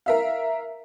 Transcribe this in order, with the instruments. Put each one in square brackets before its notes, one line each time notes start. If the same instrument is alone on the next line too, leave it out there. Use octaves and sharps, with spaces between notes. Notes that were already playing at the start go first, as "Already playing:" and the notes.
[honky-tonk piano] A#4 E5 F5